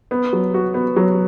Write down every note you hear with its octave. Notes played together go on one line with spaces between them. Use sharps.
B3
F#3
F#4
B3
F#3